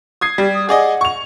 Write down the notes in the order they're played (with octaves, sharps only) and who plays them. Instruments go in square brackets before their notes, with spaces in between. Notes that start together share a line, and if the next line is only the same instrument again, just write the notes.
[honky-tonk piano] D#6 G#6 C7
[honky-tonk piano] G3 [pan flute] G4
[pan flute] D#6
[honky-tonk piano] G#4 D5 D#5 [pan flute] F#5
[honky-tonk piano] C#6 F7